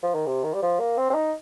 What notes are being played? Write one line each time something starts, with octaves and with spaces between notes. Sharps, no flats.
F3
D#3
C3
D#3
G3
F3
A#3
C4
C4
D#4